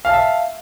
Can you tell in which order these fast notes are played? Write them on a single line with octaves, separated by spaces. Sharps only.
F5 A5 E5